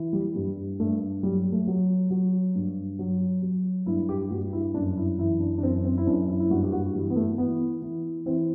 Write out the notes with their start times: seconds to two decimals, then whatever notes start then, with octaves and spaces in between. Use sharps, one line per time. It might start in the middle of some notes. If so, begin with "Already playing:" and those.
Already playing: E3
0.13 G3
0.36 G2 G3
0.80 G2 A3
1.23 F#3 G3
1.52 A3
1.67 F#3
2.11 F#3
2.55 G2
2.99 F#3
3.42 F#3
3.86 G2 E4
4.09 G4
4.31 G2 F#4
4.53 E4
4.74 F#2 D4
4.97 E4
5.18 E3 E4
5.40 D4
5.58 D4
5.62 F#2 C4
5.85 C4
5.97 E4
6.07 F#2 D4
6.28 E4
6.40 E4
6.50 G2 F#4
6.64 G4
6.72 F#4
6.95 E3 G3
7.10 B3
7.16 A3
7.38 E3 B3
7.82 E3
8.26 E3 C4